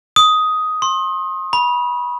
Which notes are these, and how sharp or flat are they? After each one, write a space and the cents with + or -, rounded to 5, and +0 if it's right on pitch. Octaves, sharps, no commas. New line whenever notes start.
D#6 +5
C6 +35
B5 -25